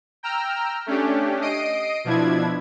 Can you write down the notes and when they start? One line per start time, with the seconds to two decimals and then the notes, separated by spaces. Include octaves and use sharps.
0.23 G5 A#5 E6 F6
0.86 A3 C#4 D4 G4
1.41 D#5 D#6 C7 D7 D#7
2.04 B2 F3 D4 E4 G#6